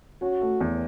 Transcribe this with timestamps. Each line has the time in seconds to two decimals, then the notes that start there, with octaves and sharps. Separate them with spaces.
0.22 C#4 F#4
0.41 A3
0.60 E2